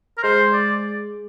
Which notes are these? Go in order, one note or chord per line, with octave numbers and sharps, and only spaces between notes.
A#4
G#3 C5
D5